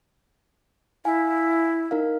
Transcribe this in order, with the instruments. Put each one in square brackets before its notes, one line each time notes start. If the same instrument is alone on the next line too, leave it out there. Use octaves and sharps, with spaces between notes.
[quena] E4 [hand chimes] F5 G#5
[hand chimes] D#4 A#4 F5